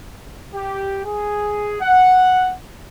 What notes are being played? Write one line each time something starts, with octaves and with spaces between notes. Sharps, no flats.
G4
G#4
F#5